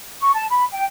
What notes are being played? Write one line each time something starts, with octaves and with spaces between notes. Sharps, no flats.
C#6
A5
B5
G5